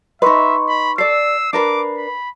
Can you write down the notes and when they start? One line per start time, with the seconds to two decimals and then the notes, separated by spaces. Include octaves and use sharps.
0.22 D#4 B4 D#5 E5 C6 C#6
0.69 B5
0.98 A4 D5 E6 C7
1.53 D4 A#4 B4 D6
1.97 B5